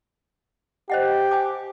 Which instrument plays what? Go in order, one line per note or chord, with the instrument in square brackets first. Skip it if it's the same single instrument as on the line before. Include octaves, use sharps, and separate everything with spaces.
[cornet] G4 [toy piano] C5 D#5 F#5
[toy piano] G5 G#5 D6